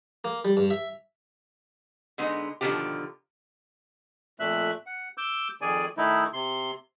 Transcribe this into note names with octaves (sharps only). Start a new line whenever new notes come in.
A#3
G3
G2
E5
D3 G#3 B3 D#4
B2 D3 D#3 F3 G#3 G4
F2 A#2 A3 E5 F#6
F#5
D6 E6 G6
F2 D#3 G#4 D5 G#5
D#3 A3 D#4 E4
C3 C6